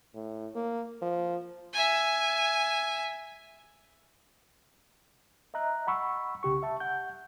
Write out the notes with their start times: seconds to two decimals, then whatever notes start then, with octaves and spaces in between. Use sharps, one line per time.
0.15 A2
0.55 A#3
1.02 F3
1.73 E5 G#5
5.54 D#5 E5 A#5 F#6
5.87 F#5 B5 C#6 E6
6.43 C2 C#3 G4 C#6
6.63 E5 A5
6.80 F#5 G6